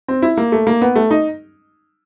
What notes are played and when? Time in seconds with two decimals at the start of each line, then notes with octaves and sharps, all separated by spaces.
0.08 C4
0.22 E4
0.37 A#3
0.52 A3
0.67 A#3
0.82 B3
0.96 A3
1.11 D#4